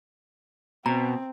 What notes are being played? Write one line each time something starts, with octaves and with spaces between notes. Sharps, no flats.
B2 C4 A#5